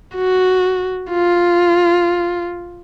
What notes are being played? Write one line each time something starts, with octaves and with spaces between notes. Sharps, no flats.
F#4
F4